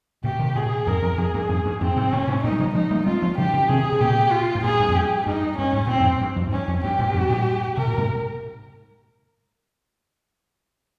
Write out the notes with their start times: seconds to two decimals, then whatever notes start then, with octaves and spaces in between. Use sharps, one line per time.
0.24 A#2 C#3 G4
0.39 C3 D#3
0.55 A#2 C#3 G#4
0.87 F2 G#2 A#4
1.02 F2
1.18 F2 G#4
1.34 G2
1.49 F2 G#2
1.65 G2
1.81 F2 G#2 C4
1.96 G#2 C3
2.12 A#2 C#3 C#4
2.28 G#2 C3
2.44 G2 A#2 D#4
2.52 G3
2.59 C#3 F3
2.75 F3 G#3 D#4
2.90 G3 A#3
3.06 G#3 C4 F4
3.22 F3 G#3
3.38 C#3 F3 G4
3.53 C#3 F3
3.69 C3 D#3 G#4
3.92 C3
4.00 A#2 C#3 G4
4.31 F4
4.55 G#2
4.63 G2 A#2 G#4
4.79 G2
4.88 F2
4.94 G2 G4
5.26 G2 D#4
5.57 G2 C#4
5.73 G#2
5.87 A#2 C4
6.00 F2 G#2
6.21 G2
6.36 F2
6.47 G#2
6.52 G2 C#4
6.68 F2
6.84 G2 G4
6.99 G2 A#2
7.09 G2
7.14 F2 G#2
7.30 G2 A#2
7.77 C3 A#4
7.87 A#2
7.98 G#2 C3